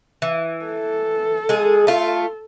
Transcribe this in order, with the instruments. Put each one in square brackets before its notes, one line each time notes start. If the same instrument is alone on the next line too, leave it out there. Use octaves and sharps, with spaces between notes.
[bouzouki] E3
[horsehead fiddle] A4
[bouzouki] G#3 G#4
A3 F4